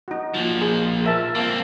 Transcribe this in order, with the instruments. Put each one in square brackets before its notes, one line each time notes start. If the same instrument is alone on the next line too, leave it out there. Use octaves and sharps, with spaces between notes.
[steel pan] D#4 F#4
[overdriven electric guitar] A#2 F3
[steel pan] D#4 G#4
A#4 E5 A5
[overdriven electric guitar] A#3 C4 [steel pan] F4 A5